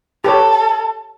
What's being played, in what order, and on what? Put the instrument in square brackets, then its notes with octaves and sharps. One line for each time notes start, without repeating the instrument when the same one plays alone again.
[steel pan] G4 B4 C#5 [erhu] A4